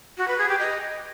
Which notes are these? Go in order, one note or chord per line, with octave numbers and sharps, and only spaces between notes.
F#4
B4
G#4
G4
D#5